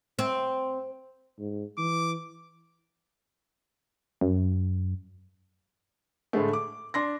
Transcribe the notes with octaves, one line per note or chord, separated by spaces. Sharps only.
C4
G#2
E3 D6
F#2
A2 D3 G#3 A3
D6
D4 C6 A#6